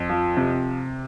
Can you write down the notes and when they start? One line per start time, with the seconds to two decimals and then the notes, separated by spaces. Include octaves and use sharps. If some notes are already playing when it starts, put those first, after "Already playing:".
Already playing: F2
0.09 F3
0.37 C3